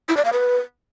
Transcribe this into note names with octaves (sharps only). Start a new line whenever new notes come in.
E4
D5
F5
B4